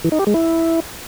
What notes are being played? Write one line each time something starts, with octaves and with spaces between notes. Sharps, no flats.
E3
D#4
G4
G#3
E4